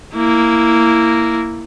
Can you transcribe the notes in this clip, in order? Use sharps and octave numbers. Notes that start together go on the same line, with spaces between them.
A#3 E4